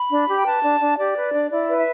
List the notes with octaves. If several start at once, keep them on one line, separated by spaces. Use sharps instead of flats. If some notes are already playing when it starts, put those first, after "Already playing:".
Already playing: B5
D4
G4
G5
B4 A5
D4
D4
G4 D5
B4
D4
E4 D5
B4
E5